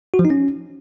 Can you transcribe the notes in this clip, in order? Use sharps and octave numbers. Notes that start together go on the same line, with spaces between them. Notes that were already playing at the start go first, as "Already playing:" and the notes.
F#4
F3
D#4
C#4